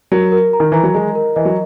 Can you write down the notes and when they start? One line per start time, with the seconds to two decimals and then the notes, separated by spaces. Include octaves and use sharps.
0.12 F#3 A#4
0.32 A#4
0.53 A#5
0.60 D#3
0.72 E3 A#5
0.83 F#3
0.94 G#3 D#5
1.15 A#4
1.36 E3 D#5
1.45 F#3